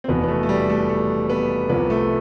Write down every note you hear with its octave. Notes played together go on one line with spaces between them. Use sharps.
C4
F1 E2 B2 B3
B3
A3
A3
G3
A3
A3
B3
C2 C3 F3 B3
A3